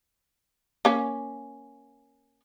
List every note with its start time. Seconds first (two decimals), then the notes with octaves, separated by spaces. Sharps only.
0.85 A#3 C#4